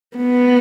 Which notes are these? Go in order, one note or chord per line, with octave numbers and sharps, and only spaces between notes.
B3